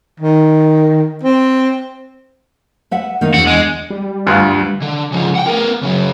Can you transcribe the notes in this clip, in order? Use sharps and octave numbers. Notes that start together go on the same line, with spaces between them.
D#3
C4
B4 E5 F#5
D#3 A#3 D#4
E2 D3 F#4
G#3
G3
D2 G2 F4
D3
C#3 F3
F#5 G5
B3 A#4
C#3 F#3